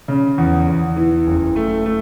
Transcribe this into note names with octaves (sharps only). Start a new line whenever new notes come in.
C#3
E2
E2
E3
F#1
A3
A3